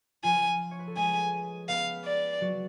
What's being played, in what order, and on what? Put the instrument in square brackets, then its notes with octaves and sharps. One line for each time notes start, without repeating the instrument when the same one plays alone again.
[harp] F3 F4 [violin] G#5
[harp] C#5
B4
A4
[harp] G#3 G#4 [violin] G#5
[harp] B3 B4 [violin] F5
[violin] D5
[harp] F#3 F#4